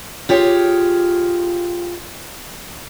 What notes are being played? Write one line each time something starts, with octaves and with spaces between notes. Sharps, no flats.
F4 G4 G#4 C#5